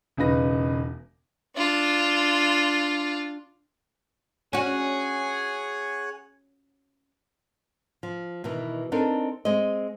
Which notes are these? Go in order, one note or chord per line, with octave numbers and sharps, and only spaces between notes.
E1 C#3 D#4 B4 A#6
D4 F4
C#4 F#4 G#4 C#5 F#5 G#5
F3
B2 D#3 E3
C4 D4 D#4 A4 A#4
G#3 C4 C5 D#5